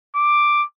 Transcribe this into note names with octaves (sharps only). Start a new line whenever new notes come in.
D6